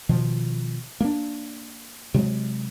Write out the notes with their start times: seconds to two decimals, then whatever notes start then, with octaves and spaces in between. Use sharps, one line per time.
0.09 B2 D#3 F3
1.00 A#3 D4
2.14 C3 F#3 G#3